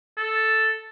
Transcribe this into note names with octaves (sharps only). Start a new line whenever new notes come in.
A4